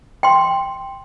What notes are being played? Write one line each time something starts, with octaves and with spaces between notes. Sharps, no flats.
G5 C6